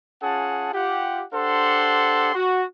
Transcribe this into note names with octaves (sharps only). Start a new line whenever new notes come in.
C#4 F4 G#4 F#5 A5
F4 G4 F#5
D4 G4 A4 C5 F#5 C6
F#4